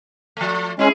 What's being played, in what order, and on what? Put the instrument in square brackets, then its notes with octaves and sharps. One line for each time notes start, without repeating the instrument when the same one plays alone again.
[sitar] F3 A3
[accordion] G#3 C#4 [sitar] E4 G#4